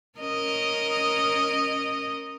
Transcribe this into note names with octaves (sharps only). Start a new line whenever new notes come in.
C#4 A#4 D#5